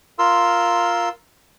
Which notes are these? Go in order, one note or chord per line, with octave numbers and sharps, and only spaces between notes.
F4 A#4 C6 E6